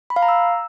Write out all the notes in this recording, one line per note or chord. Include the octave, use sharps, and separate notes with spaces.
B5
F5
A#5
E6